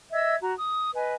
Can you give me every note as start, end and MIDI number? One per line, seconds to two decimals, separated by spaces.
0.12 0.36 75
0.12 0.36 76
0.12 0.36 88
0.12 0.36 92
0.42 0.54 66
0.42 0.54 82
0.56 0.91 87
0.94 1.16 71
0.94 1.16 75
0.94 1.16 80